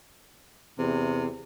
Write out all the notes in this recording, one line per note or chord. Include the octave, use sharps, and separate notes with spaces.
E2 C3